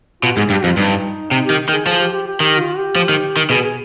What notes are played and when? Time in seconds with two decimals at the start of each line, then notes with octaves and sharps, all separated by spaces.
0.23 B2 F4
0.37 G#2 G#4
0.50 G2 G4
0.64 F2 F4
0.77 G2 D#4
1.31 C3 D#4
1.45 D#3 G4
1.69 D#3
1.73 G#4
1.86 F3 G#4
2.00 G4
2.13 G4
2.27 G4
2.40 D#3 G4
2.60 F4
2.77 G4
2.96 F3
3.09 D#3
3.37 D#3
3.50 B2 G#4
3.64 G#4